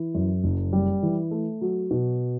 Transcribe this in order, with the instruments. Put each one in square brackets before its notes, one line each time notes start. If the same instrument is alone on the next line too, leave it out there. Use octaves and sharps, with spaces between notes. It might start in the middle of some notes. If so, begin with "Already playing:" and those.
Already playing: [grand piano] E3
F#2
F#1
G3
E3
A3
F#3
B2